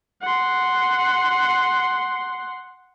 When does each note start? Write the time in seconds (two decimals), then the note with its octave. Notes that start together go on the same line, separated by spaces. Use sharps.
0.21 F#5 C6